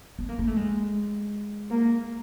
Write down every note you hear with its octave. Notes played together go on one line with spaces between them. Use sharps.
B3
A#3
A#3
A3
G#3
A#3